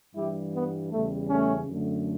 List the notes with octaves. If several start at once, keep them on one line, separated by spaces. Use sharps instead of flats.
G2 E3 G3 E4 G4
B3
E2 C#3 G3 A3
A3 C#4
F#2 D3 A3